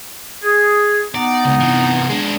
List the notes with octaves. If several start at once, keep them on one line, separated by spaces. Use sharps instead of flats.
G#4
B3 D#4 D5
C#2
C3 E3
G#3 D4